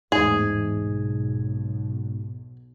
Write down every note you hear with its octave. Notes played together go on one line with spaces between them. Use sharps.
A1 E2 G#2 A3 G#4
B1